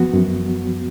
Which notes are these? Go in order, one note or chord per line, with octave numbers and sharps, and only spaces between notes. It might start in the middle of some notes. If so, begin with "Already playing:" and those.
Already playing: F#2 F3 B3 F#4
F#2